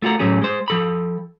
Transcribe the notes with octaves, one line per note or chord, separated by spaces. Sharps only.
A3 F4 F#4 A#4
A2 F#3 A3 C#4 G#4
G#3 C5
F3 A4 B5